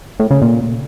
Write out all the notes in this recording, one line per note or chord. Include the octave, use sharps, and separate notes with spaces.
A2
C#3
A#2